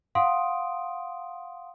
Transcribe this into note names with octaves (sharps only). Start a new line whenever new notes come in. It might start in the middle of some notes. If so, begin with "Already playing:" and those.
F5 F#5 C6 D#6 D7